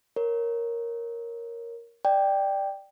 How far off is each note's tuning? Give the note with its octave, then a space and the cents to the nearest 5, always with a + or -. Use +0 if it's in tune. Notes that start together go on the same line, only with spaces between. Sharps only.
A#4 +0 C#5 +0
D5 +10 G5 +0